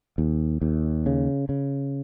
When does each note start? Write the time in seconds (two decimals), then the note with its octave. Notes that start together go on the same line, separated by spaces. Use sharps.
0.18 D#2
0.62 D#2
1.06 C#3
1.49 C#3